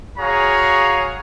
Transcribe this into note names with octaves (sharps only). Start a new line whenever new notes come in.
F#4 G#4 C#5 F5 A#5